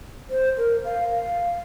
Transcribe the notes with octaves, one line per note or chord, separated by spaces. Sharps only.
C5
A#4
F5
F5